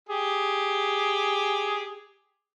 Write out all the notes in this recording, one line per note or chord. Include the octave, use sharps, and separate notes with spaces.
G4 G#4